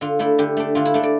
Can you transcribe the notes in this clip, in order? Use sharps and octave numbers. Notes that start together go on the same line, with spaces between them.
D3 F4
A3 D4 E4
D3 G4
A3 D4
D3 F4
E4
A3 D4
D5